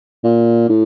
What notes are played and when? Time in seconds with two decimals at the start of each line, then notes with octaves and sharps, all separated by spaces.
0.24 A#2
0.69 A2